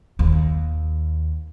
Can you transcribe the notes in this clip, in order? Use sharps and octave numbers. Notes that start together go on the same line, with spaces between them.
D#2